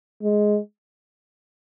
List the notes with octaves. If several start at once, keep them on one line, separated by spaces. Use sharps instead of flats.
G#3